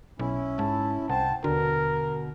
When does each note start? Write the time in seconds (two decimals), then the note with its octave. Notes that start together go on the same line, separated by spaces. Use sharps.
0.19 B1 C#4 E4
0.59 G#2 A5
1.09 C2 C5 F#5 G5 A5
1.44 D#2 B2 D3 F#4 A#4